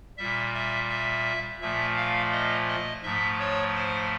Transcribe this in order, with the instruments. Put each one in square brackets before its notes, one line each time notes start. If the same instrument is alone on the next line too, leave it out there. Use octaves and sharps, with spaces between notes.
[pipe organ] A#2 G3 E5
E5
E5
A#2 F3 A3 E5
F5
D#5
D#5
G#2 F3 A3 E5
C#5
C5